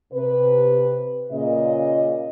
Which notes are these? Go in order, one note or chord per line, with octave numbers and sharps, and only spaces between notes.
C3 B4
A#2 C#3 D#5